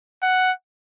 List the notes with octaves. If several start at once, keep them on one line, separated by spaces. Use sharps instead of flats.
F#5